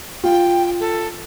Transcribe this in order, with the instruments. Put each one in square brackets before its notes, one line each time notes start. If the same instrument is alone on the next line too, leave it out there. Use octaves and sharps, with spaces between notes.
[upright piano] F4 [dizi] G5
[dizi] A4